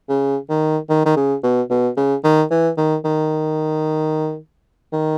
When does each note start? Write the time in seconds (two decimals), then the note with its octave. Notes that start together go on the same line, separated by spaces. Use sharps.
0.09 C#3
0.50 D#3
0.89 D#3
1.06 D#3
1.16 C#3
1.43 B2
1.70 B2
1.97 C#3
2.24 D#3
2.50 E3
2.77 D#3
3.05 D#3
4.93 D#3